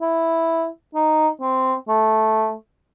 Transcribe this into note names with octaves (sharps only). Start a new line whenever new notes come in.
E4
D#4
C4
A3